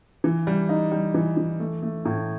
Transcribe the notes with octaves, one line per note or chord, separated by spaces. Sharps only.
E3
G3
D#4
G3
E3
E3
A3
A3
A2